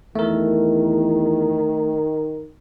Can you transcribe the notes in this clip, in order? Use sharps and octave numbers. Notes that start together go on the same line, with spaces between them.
E2 D#3 A3 A#4